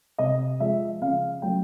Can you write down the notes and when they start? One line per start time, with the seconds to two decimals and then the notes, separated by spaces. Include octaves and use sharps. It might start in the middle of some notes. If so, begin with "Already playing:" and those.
0.18 C3 D#5
0.60 F3 G#3 E5
1.02 C#3 F5
1.42 F#3 A3 G5